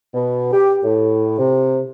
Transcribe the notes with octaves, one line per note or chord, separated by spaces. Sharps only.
B2
G4
A2
C3